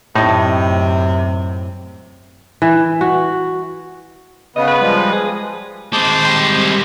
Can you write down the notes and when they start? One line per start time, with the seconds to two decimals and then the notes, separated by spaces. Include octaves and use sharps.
0.15 F#2 A2 C3 C4 D#4
2.62 E3
3.01 F#4
4.56 C#3 B3 D#5
4.68 B4
4.81 F3 G3 G#3
5.12 G#4
5.93 G#3 C4 C5 A5 D6
6.25 G3 G5 C6